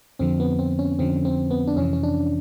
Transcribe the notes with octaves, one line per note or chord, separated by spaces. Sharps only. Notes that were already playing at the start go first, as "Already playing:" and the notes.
F2 D3 F3 C4
B3
C4
C#4
F2 D3 F3 C4
C4
B3
D4
F2 C3 E3 C#4
C#4
D4